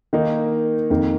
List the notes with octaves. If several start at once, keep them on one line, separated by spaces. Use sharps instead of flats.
D#3 A#3 D#4
F2 D#3 A#3